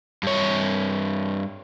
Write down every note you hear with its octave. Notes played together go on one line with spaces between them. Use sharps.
G2 C#5